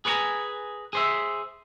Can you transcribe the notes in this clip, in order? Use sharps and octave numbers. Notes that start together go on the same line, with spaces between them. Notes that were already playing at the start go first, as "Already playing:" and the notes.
G#4 B4 C#5 F#5 G#5 A#5
G#4 C5 E5